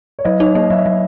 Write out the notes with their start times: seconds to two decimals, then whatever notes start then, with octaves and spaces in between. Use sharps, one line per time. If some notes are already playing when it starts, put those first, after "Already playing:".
0.19 C#5
0.25 F#3 D#5
0.40 D#4 C#5
0.55 A#3 D#5
0.70 F#3 E5
0.86 F#3